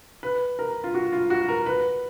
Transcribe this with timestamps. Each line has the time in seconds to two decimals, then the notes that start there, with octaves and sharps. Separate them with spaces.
0.23 B4
0.59 A#4
0.84 F4
0.94 F#4
1.12 F4
1.30 F#4
1.48 A#4
1.66 B4